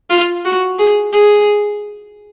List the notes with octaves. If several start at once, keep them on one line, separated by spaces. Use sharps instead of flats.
F4
F#4
G#4
G#4